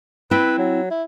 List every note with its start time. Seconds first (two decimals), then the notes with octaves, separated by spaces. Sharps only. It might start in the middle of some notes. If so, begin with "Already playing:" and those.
0.31 C4 E4 B4 G5
0.58 F#3
0.90 E4